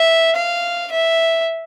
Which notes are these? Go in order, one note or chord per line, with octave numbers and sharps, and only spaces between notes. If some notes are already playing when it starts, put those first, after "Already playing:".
Already playing: E5
F5
E5